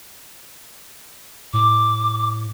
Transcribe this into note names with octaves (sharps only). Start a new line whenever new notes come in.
A2 D6